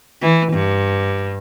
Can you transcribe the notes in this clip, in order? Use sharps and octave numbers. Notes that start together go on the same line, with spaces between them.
E3
G2